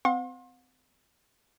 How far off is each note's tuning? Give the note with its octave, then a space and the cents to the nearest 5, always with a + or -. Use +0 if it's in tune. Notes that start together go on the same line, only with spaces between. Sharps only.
C4 -35 F#5 -45 C6 +35